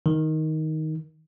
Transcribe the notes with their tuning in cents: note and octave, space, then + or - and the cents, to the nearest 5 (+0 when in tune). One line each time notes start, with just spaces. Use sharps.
D#3 +10